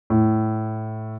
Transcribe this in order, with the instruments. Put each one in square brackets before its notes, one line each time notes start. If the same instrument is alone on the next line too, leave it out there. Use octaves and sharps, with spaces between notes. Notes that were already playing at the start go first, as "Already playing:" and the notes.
[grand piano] A2